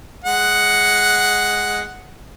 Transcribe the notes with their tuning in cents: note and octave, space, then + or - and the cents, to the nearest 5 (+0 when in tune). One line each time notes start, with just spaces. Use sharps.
G#3 +0 F#5 +0